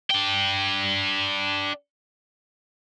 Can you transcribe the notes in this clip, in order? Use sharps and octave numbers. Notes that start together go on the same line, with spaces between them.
D4 G5